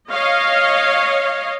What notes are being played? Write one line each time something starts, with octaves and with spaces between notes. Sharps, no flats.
C#5 D#5 F5